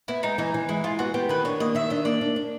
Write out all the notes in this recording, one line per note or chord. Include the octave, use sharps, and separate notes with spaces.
B3 E4
G#3 D#4
E3 D#4
E3
G#3 E4
G#3 F4
B3 F#4
B3 G4
D#3 B4
D4 C#5
A#3 D#5
D#3 E5
D4 D#5
A#3 D5
D4
D4